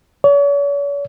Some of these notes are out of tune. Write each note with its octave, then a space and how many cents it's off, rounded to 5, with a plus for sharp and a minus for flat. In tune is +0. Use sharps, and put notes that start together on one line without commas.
C#5 +40